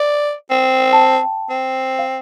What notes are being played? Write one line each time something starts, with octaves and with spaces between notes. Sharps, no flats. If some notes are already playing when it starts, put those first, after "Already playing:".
Already playing: D5
C4
A5
G5
C4
F5